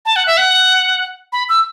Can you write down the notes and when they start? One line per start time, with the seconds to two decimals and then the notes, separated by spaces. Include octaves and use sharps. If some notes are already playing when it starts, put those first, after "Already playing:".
0.05 A5
0.16 F#5
0.27 E5
0.37 F#5
1.32 B5
1.49 E6